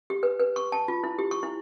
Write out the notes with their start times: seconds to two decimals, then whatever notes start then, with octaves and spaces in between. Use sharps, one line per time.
0.10 G4
0.23 B4
0.40 B4
0.56 C#6
0.72 A5
0.88 F4
1.04 E4
1.19 G4
1.31 C#6
1.43 E4